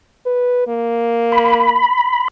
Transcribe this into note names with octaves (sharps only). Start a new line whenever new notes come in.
B4
A#3
B5